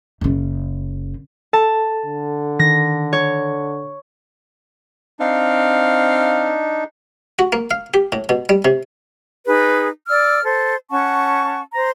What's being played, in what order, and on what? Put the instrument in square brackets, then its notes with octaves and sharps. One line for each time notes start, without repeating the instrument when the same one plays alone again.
[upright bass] F#1 C#3
[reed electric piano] A4 [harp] A5
[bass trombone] D3
[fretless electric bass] D#3 [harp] A#6
[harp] C#5
[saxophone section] C4 F5 [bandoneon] D4 D#4
[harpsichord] F#4
A#3
F5
G4
A2
B2
G3
C3
[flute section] D#4 G#4 B4
D5 E6 F6
A4 C5
C#4 F#5 A5 C#6
C5 A#5